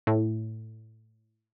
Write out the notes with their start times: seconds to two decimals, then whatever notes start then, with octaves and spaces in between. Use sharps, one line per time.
0.07 A2